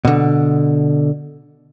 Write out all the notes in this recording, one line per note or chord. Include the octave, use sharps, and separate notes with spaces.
B2 D3